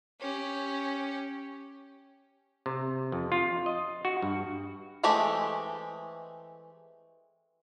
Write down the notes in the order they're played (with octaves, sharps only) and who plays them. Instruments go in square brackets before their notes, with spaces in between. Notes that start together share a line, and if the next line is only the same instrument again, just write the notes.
[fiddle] C#4 G4
[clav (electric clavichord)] C3
F2
F4
D#5
F#4
G2
[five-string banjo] E3 G#3 A3 C4 G4